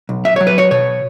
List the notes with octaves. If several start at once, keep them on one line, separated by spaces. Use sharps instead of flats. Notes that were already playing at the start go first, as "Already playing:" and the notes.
B1
E5
F#3 C#5
B4
C#5
B2 C#5